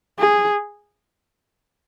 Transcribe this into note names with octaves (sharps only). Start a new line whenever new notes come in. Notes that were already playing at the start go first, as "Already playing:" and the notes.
G#4